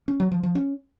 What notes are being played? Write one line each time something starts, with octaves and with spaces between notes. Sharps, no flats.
C#4
F#3
F3
F3
C#4